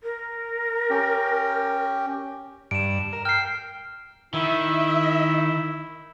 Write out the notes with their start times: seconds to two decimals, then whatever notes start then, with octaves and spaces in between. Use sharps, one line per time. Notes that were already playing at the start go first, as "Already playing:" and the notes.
0.03 A#4
0.90 C#4 G4 G5
2.71 G2 D7 E7
3.13 A#4
3.25 G5 F6 C7
4.34 D#3 E4 E5